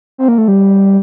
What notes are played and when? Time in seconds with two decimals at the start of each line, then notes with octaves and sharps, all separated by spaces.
0.18 C4
0.28 A#3
0.38 A3
0.48 G3